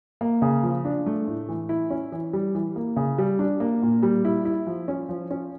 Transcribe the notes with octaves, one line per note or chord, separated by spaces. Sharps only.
A#3
C#3
F3
D4
A3
A2
E3
E4
C#4
E3
G3
E3
A#3
C#3
G3
D4
A#3
A#2
G3
E4
E4
F3
C#4
F3
C#4